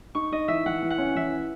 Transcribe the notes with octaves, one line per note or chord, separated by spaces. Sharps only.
D#4 C#6
D#4 D#5
E3 E5
E3 F#5
E3
F#5
C#4
E3 E5